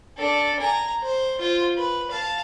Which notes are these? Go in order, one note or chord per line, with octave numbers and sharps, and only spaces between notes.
D4 A4
G#5 A#5
C5
F4 C5
B4
F5 A5